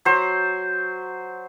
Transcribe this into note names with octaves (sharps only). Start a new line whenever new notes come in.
F#3 C5